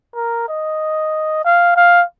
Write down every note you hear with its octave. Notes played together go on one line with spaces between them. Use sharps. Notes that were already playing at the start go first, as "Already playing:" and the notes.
A#4
D#5
F5
F5